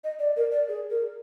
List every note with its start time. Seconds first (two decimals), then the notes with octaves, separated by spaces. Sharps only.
0.04 D#5
0.19 D5
0.37 A#4
0.52 D5
0.69 G#4
0.90 A#4